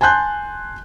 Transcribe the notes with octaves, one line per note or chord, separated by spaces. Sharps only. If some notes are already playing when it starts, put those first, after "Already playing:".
G#5 A5 C6 F#6 G6